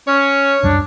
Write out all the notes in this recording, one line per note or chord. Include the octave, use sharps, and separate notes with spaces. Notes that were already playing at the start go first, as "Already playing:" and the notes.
C#4 C#5
C#2 F#2 G3 D4